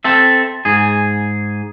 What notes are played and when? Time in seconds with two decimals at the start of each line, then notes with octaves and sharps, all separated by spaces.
0.04 C4 A4 E5
0.65 G#2 G#4